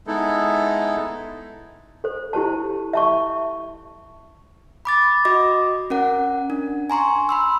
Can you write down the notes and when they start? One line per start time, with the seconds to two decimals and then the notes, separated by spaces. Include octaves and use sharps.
0.07 G#3 B3 D#4 E4 A4
2.04 A4 C5
2.33 E4 G4 C5 A5
2.93 E5 A5 C#6
4.85 B5 D6 A6
5.25 F#4 D#5 D6 A#6
5.90 C#4 A#4 F#5
6.50 D4
6.90 G#5 A#5 C6 C#6
7.29 B5 C6 E6